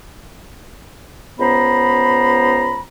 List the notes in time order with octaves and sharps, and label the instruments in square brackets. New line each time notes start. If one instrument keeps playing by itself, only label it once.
[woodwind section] C#2 B3 C5 A#5 B5